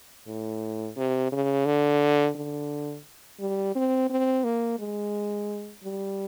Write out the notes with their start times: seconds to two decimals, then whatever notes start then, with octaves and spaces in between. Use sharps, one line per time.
0.27 A2
0.96 C3
1.32 C#3
1.66 D3
2.35 D3
3.40 G3
3.75 C4
4.10 C4
4.44 A#3
4.79 G#3
5.83 G3